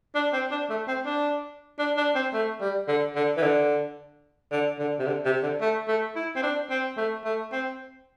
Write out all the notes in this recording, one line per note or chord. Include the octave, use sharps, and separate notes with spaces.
D4
C4
D4
A3
C4
D4
D4
D4
C4
A3
G3
D3
D3
E3
D3
D3
D3
C3
D3
C3
D3
A3
A3
E4
C4
D4
C4
A3
A3
C4